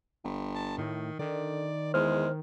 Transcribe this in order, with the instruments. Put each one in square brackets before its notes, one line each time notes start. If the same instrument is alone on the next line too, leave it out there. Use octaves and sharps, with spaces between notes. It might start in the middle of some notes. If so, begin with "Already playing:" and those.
[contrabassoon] G1
[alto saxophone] A5
[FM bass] A2 [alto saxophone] D#3
[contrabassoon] D3 [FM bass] D#3 [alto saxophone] D5
[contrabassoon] E2 [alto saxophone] G#3 [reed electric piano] C5 F6